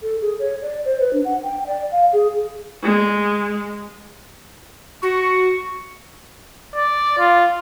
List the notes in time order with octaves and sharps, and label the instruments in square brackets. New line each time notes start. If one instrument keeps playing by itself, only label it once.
[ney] A4
G#4
C#5
D5
C5
B4
D4
F#5
G5
D5
F5
G#4
[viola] G#3
[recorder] F#4 [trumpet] C#6
[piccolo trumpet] D5
F4